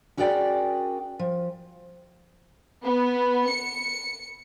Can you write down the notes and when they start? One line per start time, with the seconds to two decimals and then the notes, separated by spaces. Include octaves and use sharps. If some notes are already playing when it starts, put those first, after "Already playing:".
0.17 C#4 F#4 G#4 A#4 D5 G5
1.19 F3
2.85 B3
3.49 C#7